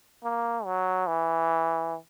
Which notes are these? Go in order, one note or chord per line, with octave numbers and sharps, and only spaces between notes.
A#3
F#3
E3